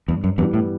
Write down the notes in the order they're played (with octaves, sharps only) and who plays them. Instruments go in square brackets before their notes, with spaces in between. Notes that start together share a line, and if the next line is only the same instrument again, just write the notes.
[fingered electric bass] E2 [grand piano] G2
[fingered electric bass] F#2
[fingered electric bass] E2 G2 [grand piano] E3 G3 B3
[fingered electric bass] A2